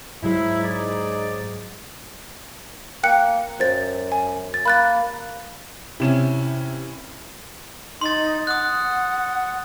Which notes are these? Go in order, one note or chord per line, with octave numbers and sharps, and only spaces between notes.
G#2 F#3 G#3 E4
D#4 G#4 D5
A#3 G5 F#6 C#7
F#2 C5 A6
G#5
A6
A#3 B5 F#6 A6
C3 C#4 E4 E7
D#4 C6 A6
F#5 D#6 F#6